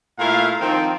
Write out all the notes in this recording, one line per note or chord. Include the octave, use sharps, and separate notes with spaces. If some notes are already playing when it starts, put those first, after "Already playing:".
A#2 A3 E4 F5
D#3 F3 C4